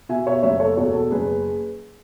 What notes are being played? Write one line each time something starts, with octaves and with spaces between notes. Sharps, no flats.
B2 E5 G#5
C#5 E5
F#1 C#5 E5
A4 C#5
E2 B2 A4 C#5
A4
F#1 G#4 B4